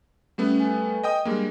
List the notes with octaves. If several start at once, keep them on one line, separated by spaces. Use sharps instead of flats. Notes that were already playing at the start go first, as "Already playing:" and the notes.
G3 A3 B3 C#4
A4 B4 G#5
D#5 G5 D#6
G3 G#3 A#3 D4